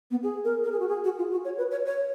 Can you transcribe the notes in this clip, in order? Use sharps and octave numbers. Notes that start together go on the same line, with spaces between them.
B3
G#4
A#4
A#4
G#4
F#4
G#4
F#4
F4
F#4
C#5
B4
C#5
C#5